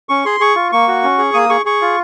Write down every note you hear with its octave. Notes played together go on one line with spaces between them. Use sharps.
C#4 C#6
G#4 C6
G#4 C#6
F4
A#3 C#6
F#4
C#4
G#4
A#3 D#6
G#4 C#6
G#4 C#6
F4